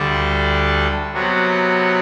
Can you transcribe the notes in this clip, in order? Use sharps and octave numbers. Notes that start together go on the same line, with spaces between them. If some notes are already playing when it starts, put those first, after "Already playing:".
Already playing: D2 D3 G3 D4 A4
C3 F#3 B3 F#4